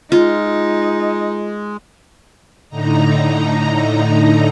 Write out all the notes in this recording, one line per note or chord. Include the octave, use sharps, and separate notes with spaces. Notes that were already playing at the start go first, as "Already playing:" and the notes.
G#3 D#4 F4
A2 D3 D#4 A#5